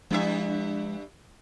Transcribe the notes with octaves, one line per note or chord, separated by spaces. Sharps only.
G2 F3 G#3 D4 E4 E5